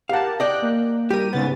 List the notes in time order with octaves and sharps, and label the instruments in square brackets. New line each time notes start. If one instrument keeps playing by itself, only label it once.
[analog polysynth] G4 A#4 A5 [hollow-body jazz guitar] F5 F#5
[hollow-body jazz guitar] D5 D#5 [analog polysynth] G5 F#6
[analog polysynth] A#3
[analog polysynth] G3 D#7 [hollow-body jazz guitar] G4 A#4
[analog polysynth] G#2 C#3 A6 [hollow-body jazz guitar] B3